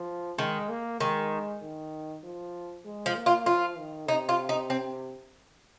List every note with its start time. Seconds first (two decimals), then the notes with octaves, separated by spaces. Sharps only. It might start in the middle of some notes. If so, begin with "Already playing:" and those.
Already playing: F3
0.38 D#3 G#3
0.69 A#3
1.00 D#3 G#3
1.62 D#3
2.23 F3
2.85 G#3
3.06 F3
3.16 A#3
3.26 F4
3.46 F3 F4
3.78 D#3
4.08 C3 D#4
4.29 F4
4.49 D#4
4.70 C4